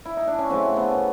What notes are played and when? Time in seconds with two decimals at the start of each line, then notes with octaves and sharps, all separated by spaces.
0.05 E4
0.17 D#4
0.27 D4
0.39 C#4
0.50 C#3 F#3 A3 C4
0.77 B3